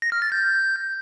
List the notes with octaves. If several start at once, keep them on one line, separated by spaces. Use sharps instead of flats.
A#6
F6
A6
G6